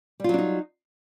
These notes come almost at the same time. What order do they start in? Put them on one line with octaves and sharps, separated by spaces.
G3 F4 F#3 D4 D#4